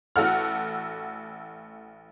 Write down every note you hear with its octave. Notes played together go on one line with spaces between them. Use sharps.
A1 F#4 A4 F#5 F6